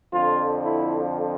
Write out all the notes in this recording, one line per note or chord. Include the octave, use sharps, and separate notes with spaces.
F2 D3 F3 F4
E4